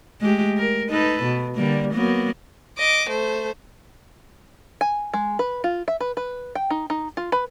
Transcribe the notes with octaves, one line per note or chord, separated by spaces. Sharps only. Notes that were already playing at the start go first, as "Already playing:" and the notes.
G#3 A3 G4
A#4
D#4 A4 B4
B2
D3 G3 A#3
F#3 A#3 B3
D#5 D6
A3 C5
G#5
G#3
B4
F4
E5
B4
B4
G5
D#4
D#4
F4
B4